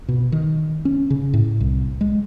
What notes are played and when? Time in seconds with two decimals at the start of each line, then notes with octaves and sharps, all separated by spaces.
0.08 B2
0.32 D#3
0.85 C#4
1.10 C#3
1.34 A2
1.60 C2
2.01 G#3